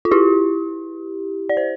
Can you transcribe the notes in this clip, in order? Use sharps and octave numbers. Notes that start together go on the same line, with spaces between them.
F4
E4 G4
D5
C5